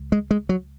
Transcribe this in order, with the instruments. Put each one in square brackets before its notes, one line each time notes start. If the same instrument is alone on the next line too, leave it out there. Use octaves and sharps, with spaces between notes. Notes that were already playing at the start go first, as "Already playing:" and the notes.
Already playing: [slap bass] C#2
G#3
G#3
F#3